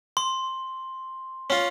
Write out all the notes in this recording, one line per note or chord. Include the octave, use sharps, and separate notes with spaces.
C6
C#4 F4